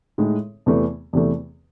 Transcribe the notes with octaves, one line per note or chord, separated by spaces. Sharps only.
A2 G#3 D#4
E2 C3 E3 A3
E2 C3 E3 A3